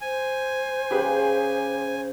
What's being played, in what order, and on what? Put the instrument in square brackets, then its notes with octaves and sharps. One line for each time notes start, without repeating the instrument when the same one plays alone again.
[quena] C5 [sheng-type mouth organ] G#5
[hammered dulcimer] C#3 [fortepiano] G4 G#4 B4